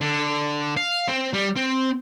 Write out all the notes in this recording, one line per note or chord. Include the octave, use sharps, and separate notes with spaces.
D3
F5
C4
G3
C4